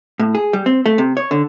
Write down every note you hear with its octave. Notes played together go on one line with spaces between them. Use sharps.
A2
G#4
G3
C4
A3
C3
C#5
D3